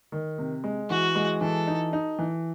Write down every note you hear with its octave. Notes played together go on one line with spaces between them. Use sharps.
D#3
C3
G#3
E3 F#4
G#3
E3 A4
D#4
D#4
E3